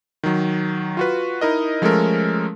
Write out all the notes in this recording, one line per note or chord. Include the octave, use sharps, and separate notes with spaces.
D#3 F#3
F4 F#4 B4
D#4 E4 A#4 D#5
F3 G#3 A3 C#4 A4 A#4